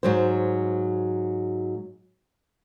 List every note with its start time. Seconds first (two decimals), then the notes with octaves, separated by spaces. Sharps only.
0.03 G#2 F#3 C5